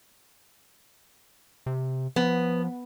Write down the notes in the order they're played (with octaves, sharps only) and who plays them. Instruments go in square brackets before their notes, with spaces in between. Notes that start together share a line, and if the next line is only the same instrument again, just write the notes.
[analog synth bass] C3
[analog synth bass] F3 [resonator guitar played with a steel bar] B3